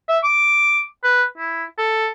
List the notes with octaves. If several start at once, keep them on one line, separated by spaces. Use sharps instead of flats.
E5
D6
B4
E4
A4